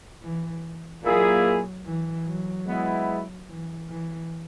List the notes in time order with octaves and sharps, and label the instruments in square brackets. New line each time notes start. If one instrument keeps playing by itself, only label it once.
[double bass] E3
[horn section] A#2 A#3 E4 G#4 [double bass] F#3
[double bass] E3
F#3
[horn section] G#3 B3 E4
[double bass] E3
E3